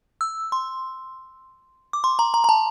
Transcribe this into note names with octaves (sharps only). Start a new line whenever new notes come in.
E6
C6
D6
C6
A#5
A#5
A#5
A5